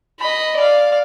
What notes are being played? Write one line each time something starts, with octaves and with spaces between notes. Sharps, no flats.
D#5 B5
D5 F5